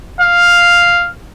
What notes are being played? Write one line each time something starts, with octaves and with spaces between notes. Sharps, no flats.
F5